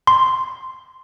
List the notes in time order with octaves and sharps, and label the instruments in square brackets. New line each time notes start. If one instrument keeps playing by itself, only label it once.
[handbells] C6